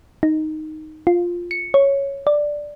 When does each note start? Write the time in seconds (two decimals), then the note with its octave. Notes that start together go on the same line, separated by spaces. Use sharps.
0.23 D#4
1.07 F4
1.51 C#7
1.74 C#5
2.27 D5